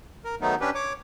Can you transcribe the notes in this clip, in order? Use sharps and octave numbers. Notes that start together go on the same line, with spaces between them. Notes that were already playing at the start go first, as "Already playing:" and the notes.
A#4
D#3 F#3 A3 B3 D#4
C#4 D4 G4 B4
C#5 D6